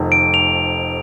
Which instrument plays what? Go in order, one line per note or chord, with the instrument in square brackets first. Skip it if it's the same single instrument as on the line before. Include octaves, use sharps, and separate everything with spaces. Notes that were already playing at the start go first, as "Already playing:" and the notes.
Already playing: [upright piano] F1 F2 D#3
[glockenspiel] D7
F7